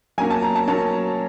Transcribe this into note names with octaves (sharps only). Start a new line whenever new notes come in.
F#3 A#3 C#4 G#5
A5
A#5
A5
F#3 A#3 C#4 A5